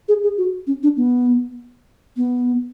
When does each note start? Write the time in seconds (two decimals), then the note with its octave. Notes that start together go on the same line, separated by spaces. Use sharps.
0.08 G#4
0.23 G#4
0.38 F#4
0.67 C#4
0.83 D4
0.97 B3
2.17 B3